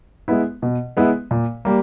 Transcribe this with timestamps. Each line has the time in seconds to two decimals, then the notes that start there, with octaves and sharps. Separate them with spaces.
0.28 G#3 B3 E4
0.62 B2
0.97 G#3 B3 E4
1.31 A#2
1.65 G3 A#3